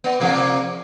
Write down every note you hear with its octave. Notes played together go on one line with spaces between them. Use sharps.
B3 D5
C3 F3 A#3